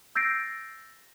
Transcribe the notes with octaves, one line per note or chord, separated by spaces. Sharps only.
E6 G6 A6 A#6 C7 D7